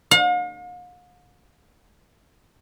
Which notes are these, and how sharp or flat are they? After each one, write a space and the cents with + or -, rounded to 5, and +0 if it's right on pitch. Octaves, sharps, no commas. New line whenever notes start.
F5 +45